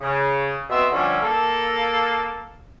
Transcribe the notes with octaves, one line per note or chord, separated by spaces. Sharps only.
C#3
B2 B3 C4 E5 C6 E6
D3 F3 G3 A3 A#3 C#4
A#3 A4